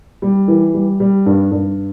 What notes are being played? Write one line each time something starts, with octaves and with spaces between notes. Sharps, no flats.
G3
E3
G3
G3
G2
G2